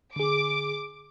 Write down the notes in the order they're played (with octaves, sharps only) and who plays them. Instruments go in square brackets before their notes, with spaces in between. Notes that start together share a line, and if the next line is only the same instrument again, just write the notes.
[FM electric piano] D3 G#4 [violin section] D6